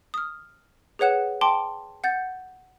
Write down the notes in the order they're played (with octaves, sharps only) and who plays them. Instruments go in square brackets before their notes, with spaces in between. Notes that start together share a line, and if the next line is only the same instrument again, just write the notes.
[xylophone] D#6 F6
G#4 B4 C#5 F#5 F#6 E7
G5 A5 C6 D6
F#5 G6 A6